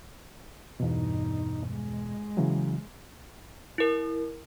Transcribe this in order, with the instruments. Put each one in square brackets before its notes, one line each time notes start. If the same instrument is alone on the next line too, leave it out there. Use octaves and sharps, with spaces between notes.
[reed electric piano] E2 B2 [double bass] G2 D#4
[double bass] G#3
[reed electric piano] C#3 E3 F#3
[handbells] E4 A#4